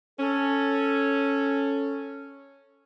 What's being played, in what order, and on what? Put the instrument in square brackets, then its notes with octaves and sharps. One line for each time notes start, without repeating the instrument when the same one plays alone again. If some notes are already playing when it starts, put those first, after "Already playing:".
[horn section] C#4 [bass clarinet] A4